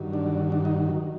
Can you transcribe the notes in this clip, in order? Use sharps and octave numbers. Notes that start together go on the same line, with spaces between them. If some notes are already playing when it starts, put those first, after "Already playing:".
Already playing: G2 D#3 F#3
D4
D4
D#4